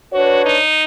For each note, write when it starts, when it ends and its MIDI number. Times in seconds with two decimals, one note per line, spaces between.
0.13 0.57 62
0.13 0.43 66
0.13 0.57 71
0.13 0.57 73
0.46 0.84 63